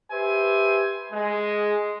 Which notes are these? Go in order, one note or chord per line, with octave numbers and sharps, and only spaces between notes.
G4 B4 C5 E5 G#5
G#3